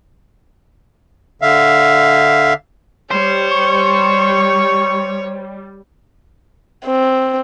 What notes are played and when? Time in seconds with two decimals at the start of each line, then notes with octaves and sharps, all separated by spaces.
1.42 D3 E5 F5
3.11 G3 C5 C#5
3.52 C#6
6.85 C4